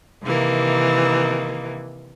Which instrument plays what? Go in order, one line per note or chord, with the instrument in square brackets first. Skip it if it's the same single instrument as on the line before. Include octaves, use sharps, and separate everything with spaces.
[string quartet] C3 D#3 E3 A#3